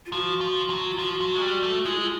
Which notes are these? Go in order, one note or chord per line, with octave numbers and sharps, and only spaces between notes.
F4
F3 F#4
F3
F#3
F4
F3 F#4
F#3
G#3
G3
A3
G#3 F4
E4
F4